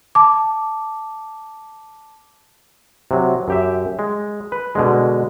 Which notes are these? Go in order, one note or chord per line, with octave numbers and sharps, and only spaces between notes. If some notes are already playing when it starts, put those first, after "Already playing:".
A5 D6
C3 F#3
F#2 G4 E5
G#3
B4
B2 D3 G#3